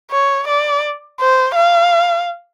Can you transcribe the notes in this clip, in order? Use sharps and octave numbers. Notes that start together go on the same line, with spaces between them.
C#5
D5
C5
F5